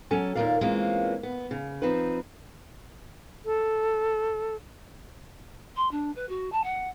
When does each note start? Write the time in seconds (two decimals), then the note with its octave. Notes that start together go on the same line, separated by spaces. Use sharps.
0.11 F#3 C#4 A4 G#5
0.35 D#2 A#2 F3 A#4 D5 F5
0.61 E3 G#3 A#3 C4 C#4 F4
1.23 B3
1.51 C#3
1.82 F3 C4 D#4 B4
3.45 A4
5.76 C6
5.91 D4
6.16 B4
6.29 F#4
6.52 A5
6.64 F#5